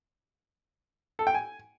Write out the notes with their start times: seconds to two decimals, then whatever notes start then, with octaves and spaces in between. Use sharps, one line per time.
1.19 A4
1.27 G5
1.34 G#5